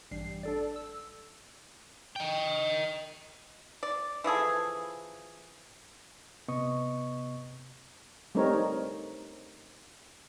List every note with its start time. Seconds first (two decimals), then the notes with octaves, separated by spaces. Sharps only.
0.11 A1 G2 G3 C7
0.43 D4 A4 D5
0.76 E6
2.16 D#5 G5
3.83 D5
4.24 E3 F3 G#4 A4
6.48 C3 B3 D#5 C#6 D#6
8.35 G3 A3 C4 D#4 A#4 C#5